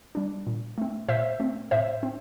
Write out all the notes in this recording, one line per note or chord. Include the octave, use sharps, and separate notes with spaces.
G3 D4
A#2
A3 C4
A#2 C5 E5
A3 C4
A2 C5 E5
C4